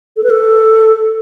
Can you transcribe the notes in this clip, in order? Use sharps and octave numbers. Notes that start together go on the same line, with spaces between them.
A4
B4
A4